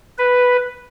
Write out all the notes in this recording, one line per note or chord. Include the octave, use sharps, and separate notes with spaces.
B4